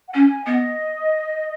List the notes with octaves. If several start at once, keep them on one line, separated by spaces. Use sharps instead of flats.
F#5
C#4 G#5
B3 D#5